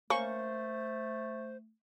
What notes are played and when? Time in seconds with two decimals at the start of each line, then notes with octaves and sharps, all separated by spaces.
0.10 A3 A#3 C#4 C5 C#6